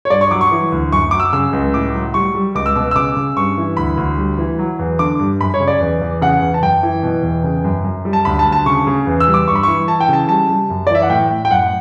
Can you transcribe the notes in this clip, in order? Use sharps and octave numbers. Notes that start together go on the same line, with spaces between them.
C#5
G2 D5
C#6
F#3 D6
C#6
E3
D2
F#2 C#6
F#3 D6
E6
C#3 E6
C#2
A2 D6
F#3
G3 C#6
G3
C#2 D6
E6
B2 D6
E6
C#3 D6
C#3
G2 C#6
E3
D2 B5
D2
G3
E3
F#3
E2
D3 D6
G2
F#2 B5
C#5
C#3
D5
E2
E2
C#3 F#5
E2
A5
F#2 G5
E3
B2
E2
C#3
F#2
F#2
G3
A5
D2 B5
A5
D2
A5
C#3 C#6
C#3
E2
E6
G3
D6
G2 C#6
B5
E3 C#6
E3 A5
G5
C#3 A5
G3 A5
G3
F#2
D5
E3 E5
F#5
A2 G5
A2
G5
F#2 F#5